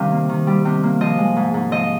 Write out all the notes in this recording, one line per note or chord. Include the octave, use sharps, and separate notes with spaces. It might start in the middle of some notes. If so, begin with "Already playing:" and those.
Already playing: C3 D#3 G3 F5
A#3
D#3
G3
C3
A#3
F3 D#5
G#3
G#2
G#2
F3 D#5